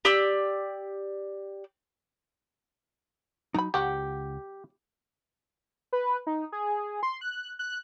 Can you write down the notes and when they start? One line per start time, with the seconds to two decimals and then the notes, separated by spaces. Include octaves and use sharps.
0.05 G4 D5 E6
3.54 F#3 D#4 A#5 B5
3.74 C#2 F#3 F#4 G4 F#5
5.93 B4
6.27 D#4
6.52 G#4
7.03 C6
7.21 F#6
7.59 F#6